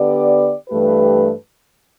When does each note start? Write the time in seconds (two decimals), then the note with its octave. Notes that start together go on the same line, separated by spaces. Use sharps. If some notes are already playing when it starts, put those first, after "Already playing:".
Already playing: D3 B3 G4 D5
0.69 G2 E3 A3 G4 B4